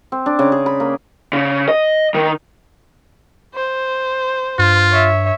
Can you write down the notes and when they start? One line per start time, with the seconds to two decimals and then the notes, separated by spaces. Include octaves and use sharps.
0.12 C4
0.26 D4
0.39 C#3
0.52 G#4
0.66 B5
0.80 A#3
1.33 C#3
1.68 D#5
2.14 D#3
3.54 C5
4.59 G2 F4
4.91 C#5 E5